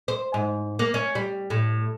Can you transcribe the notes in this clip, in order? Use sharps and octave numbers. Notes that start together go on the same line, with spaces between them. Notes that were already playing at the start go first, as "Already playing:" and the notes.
C5
G#2
A#3
C#4
G3
A2